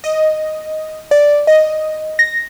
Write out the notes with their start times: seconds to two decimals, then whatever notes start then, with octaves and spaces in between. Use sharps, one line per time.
0.04 D#5
1.11 D5
1.47 D#5
2.19 A#6